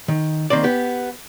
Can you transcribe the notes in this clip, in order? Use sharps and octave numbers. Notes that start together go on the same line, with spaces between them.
D#3
D#3 A#3 C4 D5
B3 G4